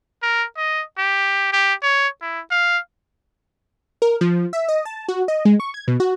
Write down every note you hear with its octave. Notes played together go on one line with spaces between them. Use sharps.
A#4
D#5
G4
G4
C#5
E4
F5
A#4
F3
E5
D#5
A5
F#4
D#5
G#3
C#6
G#6
B2
F#4